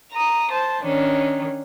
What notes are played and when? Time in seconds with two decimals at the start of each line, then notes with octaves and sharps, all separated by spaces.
0.12 A#5 D#6
0.50 C5 A5
0.83 D#3 C#4 D4